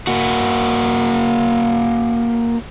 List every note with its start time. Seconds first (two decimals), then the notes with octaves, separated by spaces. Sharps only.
0.07 A#3 F#4